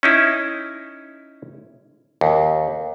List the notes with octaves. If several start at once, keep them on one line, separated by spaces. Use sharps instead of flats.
C#4 D#4 E4
D#2